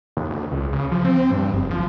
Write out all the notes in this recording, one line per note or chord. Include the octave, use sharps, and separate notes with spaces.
D#2
D2
C#2
C#3
F3
C4
G2
F#1
F3